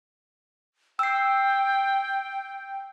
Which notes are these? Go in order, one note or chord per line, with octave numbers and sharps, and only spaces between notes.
G5 E6 C7